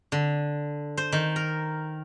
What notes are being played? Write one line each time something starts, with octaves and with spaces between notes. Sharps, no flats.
D3
C5
D#3
A#4